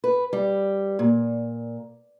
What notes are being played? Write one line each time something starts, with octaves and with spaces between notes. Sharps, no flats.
B4
G3
A#2